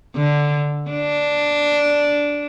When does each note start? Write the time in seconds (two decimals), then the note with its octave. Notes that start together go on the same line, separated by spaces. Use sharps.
0.16 D3
0.90 D4